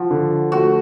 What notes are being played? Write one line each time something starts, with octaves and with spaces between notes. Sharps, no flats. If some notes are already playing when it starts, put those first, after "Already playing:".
Already playing: F3 F#4
D3
A3 F#4